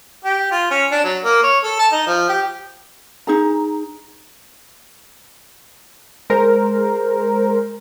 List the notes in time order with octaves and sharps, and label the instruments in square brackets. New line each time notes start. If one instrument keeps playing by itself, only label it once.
[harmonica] G4
F4
C#4
D4
F#3
A#3
C#5
A4
A5
D#4
F3
G4
[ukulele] D#4 G#4 A#5
[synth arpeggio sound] G#3 A#4 C5